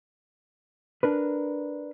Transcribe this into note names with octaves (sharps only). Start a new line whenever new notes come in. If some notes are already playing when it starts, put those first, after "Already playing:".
D4 A#4 B4